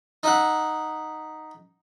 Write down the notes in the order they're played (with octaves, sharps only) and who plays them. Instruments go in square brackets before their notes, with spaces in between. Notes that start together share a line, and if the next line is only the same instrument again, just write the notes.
[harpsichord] D#4 E5 F#5